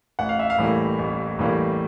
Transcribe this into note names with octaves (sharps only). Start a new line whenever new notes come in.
A1 F#5
F5
E5
F5
A2 E3 G3 A#3
A1
A2 E3 G3 A#3